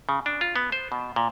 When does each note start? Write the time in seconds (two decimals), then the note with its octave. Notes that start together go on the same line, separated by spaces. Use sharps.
0.09 C#3
0.26 D4
0.41 F4
0.56 B3
0.72 C5
0.92 B2
1.16 A#2